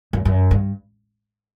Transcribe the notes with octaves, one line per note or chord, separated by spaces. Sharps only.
F#2
F#2
G2